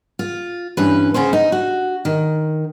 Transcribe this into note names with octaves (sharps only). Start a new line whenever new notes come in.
F4
G2 E3 C#4 B4
C#3 B3 C#4 C5
D#4
F#4
D#3